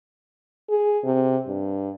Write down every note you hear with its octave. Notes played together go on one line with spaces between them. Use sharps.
G#4
C3
G2